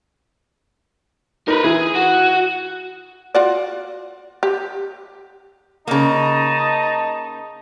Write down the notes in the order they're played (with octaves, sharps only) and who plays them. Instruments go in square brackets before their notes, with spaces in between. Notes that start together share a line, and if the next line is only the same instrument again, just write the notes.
[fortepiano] D#4 [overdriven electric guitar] A#4 B4
[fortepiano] E3 [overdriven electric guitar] G#4
[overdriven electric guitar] F#4
[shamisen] F4 F#4 D5
G4
[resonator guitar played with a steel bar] C#3 A#3 [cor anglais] D#4 [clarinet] D#5 [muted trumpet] A5